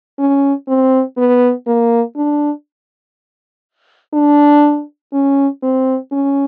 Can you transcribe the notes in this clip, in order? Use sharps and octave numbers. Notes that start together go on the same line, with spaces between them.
C#4
C4
B3
A#3
D4
D4
C#4
C4
C#4